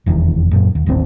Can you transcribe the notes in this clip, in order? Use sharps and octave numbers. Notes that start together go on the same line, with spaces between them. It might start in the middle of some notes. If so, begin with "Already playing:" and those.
F1 E2 G2 D#3
F#2 A#2
D#2
D#1 A1 D#2 C4